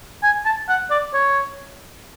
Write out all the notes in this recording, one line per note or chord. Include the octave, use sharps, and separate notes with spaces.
G#5
A5
F#5
D5
C#5